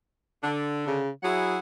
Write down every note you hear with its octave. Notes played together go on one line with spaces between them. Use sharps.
D3 D4
C#3
F#3 E4 G#4 F#5